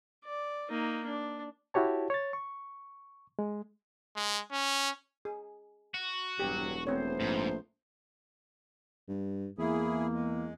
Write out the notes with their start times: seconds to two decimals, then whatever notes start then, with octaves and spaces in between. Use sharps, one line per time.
0.25 D5
0.70 A#3 D#4
1.06 D4
1.74 E4 F#4 G4 C#5 A5
2.10 C#5 A6
2.33 C#6
3.39 G#3
4.16 G#3
4.52 C#4
5.25 G#4
5.94 F#4
6.40 E1 G2 F#3 G4
6.87 A3 B3 C4 C5 C#5
7.20 A#1 G#2
9.08 G2
9.58 E2 A#3 E4 G#4
10.13 G#3